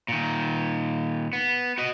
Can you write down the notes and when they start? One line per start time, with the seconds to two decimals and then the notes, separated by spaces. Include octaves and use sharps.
0.08 A#2 D#3
1.33 B3
1.78 F#4 D#5